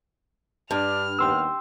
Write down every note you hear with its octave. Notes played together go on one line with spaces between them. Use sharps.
G2 D4 F6
D#2 B3 G5 C6 E6